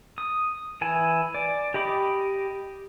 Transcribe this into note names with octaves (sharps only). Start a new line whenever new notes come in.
D#6
E3 E4 G#5
D5
G4 D#5 B5 D6